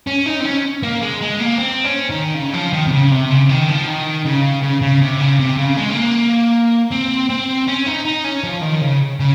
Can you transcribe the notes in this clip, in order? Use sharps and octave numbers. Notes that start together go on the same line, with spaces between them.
C#4
D#4
C4
C#4
A#3
G#3
G#3
A#3
C4
C#4
D#3
C#3
F3
D#3
C3
C#3
C3
C#3
D#3
F3
D#3
C#3
C#3
C#3
C3
C#3
C3
C#3
G#3
C4
A#3
C4
C4
C#4
D#4
D#4
C#4
F3
D#3
C#3
C#3